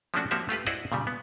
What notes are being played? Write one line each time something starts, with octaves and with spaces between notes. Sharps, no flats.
F3 G#3 A3 C#4 D4 F#4
F3 A#3 C4 F#4 G4 E5
A3 F4 G4 B4
E4 F#4 G#4 C5 D5 D#5
A#2 C#3 G3
B3